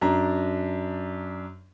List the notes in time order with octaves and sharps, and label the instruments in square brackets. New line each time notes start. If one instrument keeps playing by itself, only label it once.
[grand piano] F#2 D4 A#5